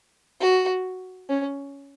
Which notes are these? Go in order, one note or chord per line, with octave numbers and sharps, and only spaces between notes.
F#4
C#4